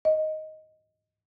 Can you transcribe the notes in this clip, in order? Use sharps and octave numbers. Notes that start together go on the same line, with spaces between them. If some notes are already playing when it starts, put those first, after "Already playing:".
D#5